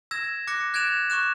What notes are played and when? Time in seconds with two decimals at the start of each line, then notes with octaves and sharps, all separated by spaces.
0.11 E6 G#6 A#6 E7
0.47 D6 F#6 A#6 C#7
0.74 F#6 G#6 A6 D7 E7 F7
1.10 C#6 D6 F#6 E7